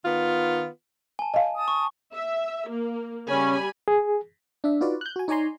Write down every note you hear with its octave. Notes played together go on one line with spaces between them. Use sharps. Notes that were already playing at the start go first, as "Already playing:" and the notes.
D#3 B3 F4
G#5 A5
D#5 F5
A5 D#6
C#6
E5
A#3
C#3 G3 C#4 G#5 B5
G#4
D4 E5
D#4 F4 F#4 B4 D5
F#6 G6
F#4 G#5
D#4 C#5 D5 G#5 A#5 C6